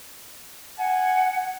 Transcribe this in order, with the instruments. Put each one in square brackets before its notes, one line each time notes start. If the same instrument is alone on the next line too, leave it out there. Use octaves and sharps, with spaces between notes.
[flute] F#5 [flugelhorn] G#5